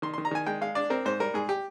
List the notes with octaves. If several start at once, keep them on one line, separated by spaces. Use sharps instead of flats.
D#3 C6
D#3 C6
A#5
D#3 G#5
G#3 G5
G#3 F5
D4 D5
C4 A#4
G#2 C5
G3 A#4
G#2 G#4
G4